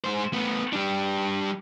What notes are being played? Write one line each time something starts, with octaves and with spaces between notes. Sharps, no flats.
G#3 C5
A3 B3
G3 D4